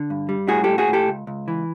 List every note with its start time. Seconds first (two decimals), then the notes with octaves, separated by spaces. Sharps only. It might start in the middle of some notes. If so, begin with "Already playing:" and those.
Already playing: D3
0.10 G2
0.29 G3
0.48 A2 F#4 G#4
0.64 A2 G4 A4
0.78 F#4 G#4
0.88 A2
0.93 G4 A4
1.08 C#2
1.27 C#2
1.48 E3